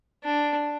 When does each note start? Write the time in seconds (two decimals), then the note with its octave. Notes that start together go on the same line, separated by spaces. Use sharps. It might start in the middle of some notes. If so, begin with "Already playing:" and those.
0.24 D4